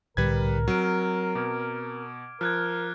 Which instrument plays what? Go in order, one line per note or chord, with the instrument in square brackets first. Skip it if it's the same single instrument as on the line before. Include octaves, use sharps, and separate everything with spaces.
[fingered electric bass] C2 A2 D3 [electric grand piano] G3 B4 G#6 [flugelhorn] A#4
[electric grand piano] F#3 [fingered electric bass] C4 [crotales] F6 D7
[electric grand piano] B2 [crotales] D6 G#6
[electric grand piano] F3 [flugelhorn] A#4 [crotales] F6 F#6 G#6